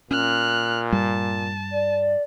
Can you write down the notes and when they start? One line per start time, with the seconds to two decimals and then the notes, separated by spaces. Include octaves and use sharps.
0.11 A#2 C#4 F6 F#6
0.92 G2 G3 A5
1.73 D5